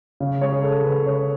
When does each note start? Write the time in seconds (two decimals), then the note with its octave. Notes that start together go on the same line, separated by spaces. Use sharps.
0.20 C#3
0.41 G#3 C#5
0.52 G#4
0.63 G#3 A4
0.84 C#3 B4
1.06 C#3 C#5